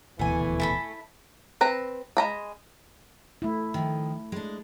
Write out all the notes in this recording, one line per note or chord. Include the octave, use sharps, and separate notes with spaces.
D#1 D2 B2 E3 A3 G#5
E4 A4 B5
C4 B4 A#5
G#3 A#5 B5
A3 E4
D#3 F3
G#3 D4